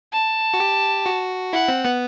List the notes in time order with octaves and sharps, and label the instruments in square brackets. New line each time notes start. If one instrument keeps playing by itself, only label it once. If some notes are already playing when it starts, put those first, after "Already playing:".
[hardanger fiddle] A5
[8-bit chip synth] F#4
G4
F#4
[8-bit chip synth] E4 [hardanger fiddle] F#5
[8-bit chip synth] C4
B3